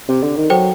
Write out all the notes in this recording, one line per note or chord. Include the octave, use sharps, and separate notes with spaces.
C3
D3
D#3
F#3 A4 C5 G5